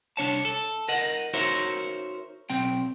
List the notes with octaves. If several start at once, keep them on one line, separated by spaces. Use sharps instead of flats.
C2 D4 C#5 A5
A4
A#4 D#5 F#5
D#4 F#4 A#4 C5 C#5 E5
B1 C4 G5